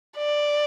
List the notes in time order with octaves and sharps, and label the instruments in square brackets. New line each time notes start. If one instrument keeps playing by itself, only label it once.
[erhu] D5